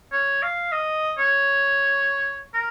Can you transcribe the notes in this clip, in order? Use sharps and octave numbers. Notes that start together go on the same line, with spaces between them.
C#5
F5
D#5
C#5
A#4